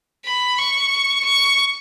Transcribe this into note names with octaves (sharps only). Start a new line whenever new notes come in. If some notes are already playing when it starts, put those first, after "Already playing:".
B5
C#6
C#6